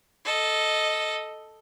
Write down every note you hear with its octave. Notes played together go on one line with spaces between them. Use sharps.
A4 D#5